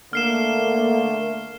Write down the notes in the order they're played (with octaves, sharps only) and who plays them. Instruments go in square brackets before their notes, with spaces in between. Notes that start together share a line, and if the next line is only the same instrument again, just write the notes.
[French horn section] D3 A3 A#3 [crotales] F6 C7 E7